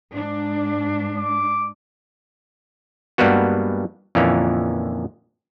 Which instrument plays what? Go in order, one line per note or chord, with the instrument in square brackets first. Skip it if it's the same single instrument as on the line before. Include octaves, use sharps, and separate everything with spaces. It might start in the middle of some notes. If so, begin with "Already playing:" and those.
[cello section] G#2 D4
[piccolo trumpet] D6
[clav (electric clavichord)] G2 G3 G#3 A#3 B3 F#4
F2 A#2 D3 E3 A#3 C#4